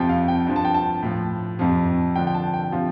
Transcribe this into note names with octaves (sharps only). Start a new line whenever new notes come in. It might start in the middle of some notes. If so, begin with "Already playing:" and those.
Already playing: F2 C3 F3 G5
F5
G5
G2 F3
A5
G5
A5
A2 F3
F2 C3 F3
G2 D3 F3 G5
G5
A5
G5
C3 F3 F4